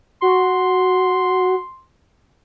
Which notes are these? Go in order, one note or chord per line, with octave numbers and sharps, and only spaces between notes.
F#4 C6